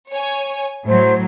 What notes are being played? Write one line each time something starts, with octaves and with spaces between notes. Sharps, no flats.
C#5 G#5
A2 F#3 C5